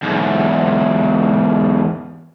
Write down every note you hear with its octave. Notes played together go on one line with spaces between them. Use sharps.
E2 G#2